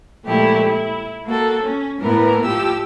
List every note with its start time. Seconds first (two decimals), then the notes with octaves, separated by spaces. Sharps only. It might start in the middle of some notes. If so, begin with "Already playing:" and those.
0.25 A#2 F3 G#3 A3 E4 G4
0.67 E4
1.25 A#3 F#4 A4
1.63 C#4
2.01 A2 E3 B3 A#4
2.45 A2 F3 G4 E6